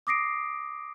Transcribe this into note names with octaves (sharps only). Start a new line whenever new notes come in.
D6 D#6 A#6 C7 D7